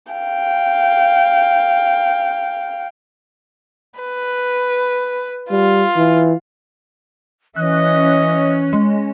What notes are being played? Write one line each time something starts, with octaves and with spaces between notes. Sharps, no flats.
F5 G5
B4
G3 F4
E3
E3 C#4 D#5 F#6
G#3